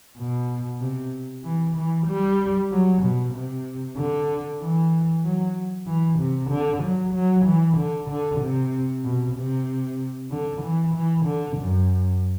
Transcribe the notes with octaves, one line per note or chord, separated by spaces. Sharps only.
B2
C3
E3
E3
G3
F#3
B2
C3
D3
E3
F#3
E3
C3
D3
F#3
F#3
E3
D3
D3
C3
B2
C3
D3
E3
E3
D3
F#2